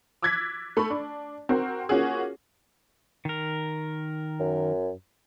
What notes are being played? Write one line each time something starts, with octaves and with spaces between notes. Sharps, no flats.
D6 E6 F#6 G#6 A6 B6
A3 B5 C#6
D4
C4 F#4 A#4
A#3 C#4 F4 F#4 G#4
D#3 A#4
F#2